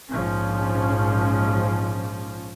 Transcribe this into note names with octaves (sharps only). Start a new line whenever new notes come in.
A#1 G#2 F3 C#4